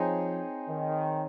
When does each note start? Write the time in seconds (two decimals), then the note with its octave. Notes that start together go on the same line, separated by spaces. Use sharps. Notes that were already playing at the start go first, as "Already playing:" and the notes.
Already playing: F3 C4 D#4 G#4 C#5
0.68 D#3